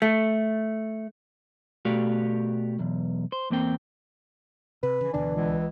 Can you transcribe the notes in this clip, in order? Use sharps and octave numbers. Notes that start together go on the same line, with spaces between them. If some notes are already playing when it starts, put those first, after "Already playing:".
A3
B2 A3 F#4 G4 D5 F5
B1 E2
C5
E2 A#3 C4 G5
C3 B4
C#3 E3
D2 B2 D3 D4
C#2 E3